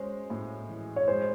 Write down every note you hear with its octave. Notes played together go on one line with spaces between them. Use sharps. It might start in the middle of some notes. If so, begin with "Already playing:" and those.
Already playing: G#3 C#4 C5
A2
E3
C#5
G#3 C5